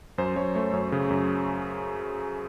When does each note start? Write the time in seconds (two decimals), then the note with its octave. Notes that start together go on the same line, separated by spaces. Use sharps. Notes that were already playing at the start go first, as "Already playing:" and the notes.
0.18 F#2 C5
0.36 F#2 C#5
0.55 A3 C#5
0.73 F#2 C#5
0.92 C#3
1.11 F#2